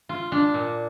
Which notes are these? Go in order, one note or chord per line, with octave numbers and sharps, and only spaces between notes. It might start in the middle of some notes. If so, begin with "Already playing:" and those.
F4
D4
A#2